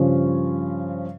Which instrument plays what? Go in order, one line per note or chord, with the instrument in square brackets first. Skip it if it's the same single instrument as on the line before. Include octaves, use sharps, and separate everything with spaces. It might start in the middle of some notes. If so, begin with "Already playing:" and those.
Already playing: [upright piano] G2 F3 C#4 [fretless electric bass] C#3